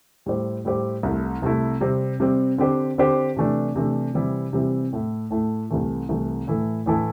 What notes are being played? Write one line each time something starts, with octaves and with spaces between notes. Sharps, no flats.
A2 G3 E4 G4 C5
A2 G3 E4 G4 C5
C2 C3 A3 E4
C2 C3 A3 E4
C3 G3 C4
C3 G3 C4
D3 C4 G4 C5
D3 C4 G4 C5
C3 E3 A3 D4
C3 E3 A3 D4
C3 E3 G3 C4 E4
C3 E3 G3 C4 E4
A2 A3 E4
A2 A3 E4
C2 C3 E3 A3
C2 C3 E3 A3
A2 E3 A3 E4 A4
A2 E3 A3 E4 A4